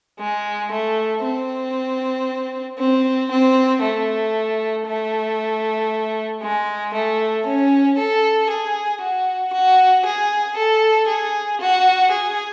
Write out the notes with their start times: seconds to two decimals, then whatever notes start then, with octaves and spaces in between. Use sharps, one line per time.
0.19 G#3
0.71 A3
1.23 C4
2.78 C4
3.30 C4
3.82 A3
4.86 A3
6.42 G#3
6.93 A3
7.45 C#4
7.97 A4
8.49 G#4
9.01 F#4
9.52 F#4
10.05 G#4
10.56 A4
11.08 G#4
11.60 F#4
12.11 G#4